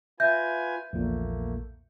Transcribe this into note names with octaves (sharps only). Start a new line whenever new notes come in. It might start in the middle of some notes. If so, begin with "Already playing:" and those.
F4 B4 E5 G#5 G6
A#1 E2 A#2 A3 A#3